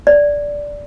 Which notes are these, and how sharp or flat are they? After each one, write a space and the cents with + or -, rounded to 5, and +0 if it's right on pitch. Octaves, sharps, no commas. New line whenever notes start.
D5 -10